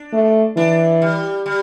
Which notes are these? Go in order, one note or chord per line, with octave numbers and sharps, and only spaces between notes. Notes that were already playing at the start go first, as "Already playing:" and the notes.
Already playing: D4
A3
E3 D4
G3
G3